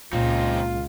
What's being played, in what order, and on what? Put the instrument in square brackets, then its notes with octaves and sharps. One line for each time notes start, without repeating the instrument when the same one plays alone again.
[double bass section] C#2 [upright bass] A#2 [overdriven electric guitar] C4 D#4 [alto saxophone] F4